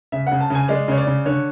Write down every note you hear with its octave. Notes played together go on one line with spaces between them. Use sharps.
C#3 E5
C#3 F#5
A5
C#3 G#5
G#3 D5
C#3 C#5
D5
C#3
D3 C#5